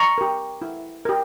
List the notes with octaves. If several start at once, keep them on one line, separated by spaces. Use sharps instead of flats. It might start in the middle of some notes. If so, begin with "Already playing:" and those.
Already playing: A#5 C#6
G4 A#4
E4
G4 A#4